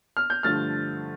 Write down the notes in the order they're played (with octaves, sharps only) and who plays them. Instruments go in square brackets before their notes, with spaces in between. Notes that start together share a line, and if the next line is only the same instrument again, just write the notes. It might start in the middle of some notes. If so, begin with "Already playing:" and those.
[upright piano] F6
G6
G2 D3 F3 A3 F6 A6